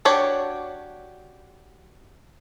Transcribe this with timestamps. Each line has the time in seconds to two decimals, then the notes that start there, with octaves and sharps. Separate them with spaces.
0.05 D4 F#4 G4 C#5